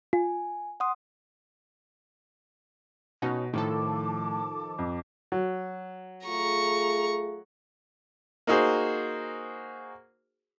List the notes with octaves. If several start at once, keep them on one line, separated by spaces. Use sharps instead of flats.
F4 G#5
F#5 C6 D#6
B2 C#4 D#4 F#4
A2 D#3 F3 A4 A5 D6
F2
F#3
A3 F4 G#4 A#5 C#6
A#3 D#4 F#4 G#4 C5